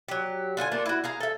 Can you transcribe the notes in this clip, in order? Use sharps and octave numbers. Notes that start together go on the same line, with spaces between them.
F#3 G4
D3 F4 D#5 G#5
A3 A#3 D4 F4
E4 F#4
G#4 F5 A#5
A4 E5